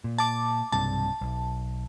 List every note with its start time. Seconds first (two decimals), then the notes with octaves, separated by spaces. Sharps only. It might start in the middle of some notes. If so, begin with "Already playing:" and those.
0.04 A#2
0.18 A5 D6
0.72 B1 G2 C3 A5
1.21 B1